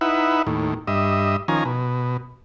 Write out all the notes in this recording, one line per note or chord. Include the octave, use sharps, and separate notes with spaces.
D#4 E4 B4 E5 F#5
D#2 A2
G2 D#5 E5
D#3 F3 C#4 G#5 A#5
B2